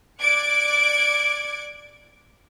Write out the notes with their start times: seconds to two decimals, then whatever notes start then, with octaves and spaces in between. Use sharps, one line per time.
0.21 D5 D6 F#6 G#6 C#7 D7